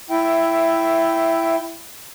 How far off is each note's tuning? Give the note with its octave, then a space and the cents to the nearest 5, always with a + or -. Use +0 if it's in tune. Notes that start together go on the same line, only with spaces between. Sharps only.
E4 +10 E5 +0 G5 -10